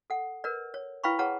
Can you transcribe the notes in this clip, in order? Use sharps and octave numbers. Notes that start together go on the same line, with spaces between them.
A4 F#5
A#4 B4 D5
C#5
E4 B4 F5 G5 B5 C#6
G#4 B4 C#5 F#5 A5 A#5